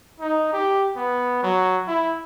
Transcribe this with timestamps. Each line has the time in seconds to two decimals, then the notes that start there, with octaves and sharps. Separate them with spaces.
0.20 D#4
0.53 G4
0.96 B3
1.43 F#3
1.88 E4